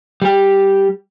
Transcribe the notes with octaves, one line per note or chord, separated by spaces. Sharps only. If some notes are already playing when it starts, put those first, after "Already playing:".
G3 G4